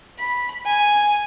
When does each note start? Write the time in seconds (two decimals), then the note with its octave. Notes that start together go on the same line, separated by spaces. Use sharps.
0.19 B5
0.66 G#5